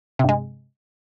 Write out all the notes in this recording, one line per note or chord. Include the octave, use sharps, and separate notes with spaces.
G2 C3 G#3